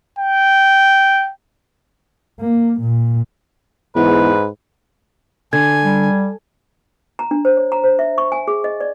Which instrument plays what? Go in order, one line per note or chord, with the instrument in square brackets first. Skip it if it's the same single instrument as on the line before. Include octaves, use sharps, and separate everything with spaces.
[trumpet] G5
[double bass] A#3
A#2
[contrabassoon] E2 [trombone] G#2 [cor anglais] B4
[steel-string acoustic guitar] D3 [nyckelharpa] G#5 [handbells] G#6
[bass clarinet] G3
[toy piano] A#5
D4
C5
C#5
A#5
C5
E5
C#6
G#5
G#4
D#5
D5